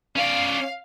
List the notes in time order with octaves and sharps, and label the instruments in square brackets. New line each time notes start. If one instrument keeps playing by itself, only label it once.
[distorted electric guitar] C#4 D5 [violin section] F5